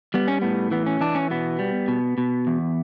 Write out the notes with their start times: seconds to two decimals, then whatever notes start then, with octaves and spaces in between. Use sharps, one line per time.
0.14 G3 B3
0.28 C#4
0.42 A2 B3
0.71 E3 B3
0.86 C#4
1.01 E3 D4
1.15 C#4
1.30 B2 B3
1.59 G3
1.88 B2
2.18 B2
2.47 E2